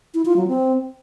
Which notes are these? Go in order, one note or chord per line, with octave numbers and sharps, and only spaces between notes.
E4
F4
F#3
C4